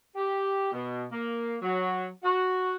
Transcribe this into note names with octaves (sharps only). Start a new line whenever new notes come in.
G4
B2
A#3
F#3
F#4